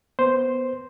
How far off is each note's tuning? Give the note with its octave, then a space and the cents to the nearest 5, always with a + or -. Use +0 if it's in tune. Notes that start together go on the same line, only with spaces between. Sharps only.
B3 +0 C5 +0